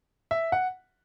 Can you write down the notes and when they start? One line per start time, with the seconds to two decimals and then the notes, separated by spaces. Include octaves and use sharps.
0.31 E5
0.52 F#5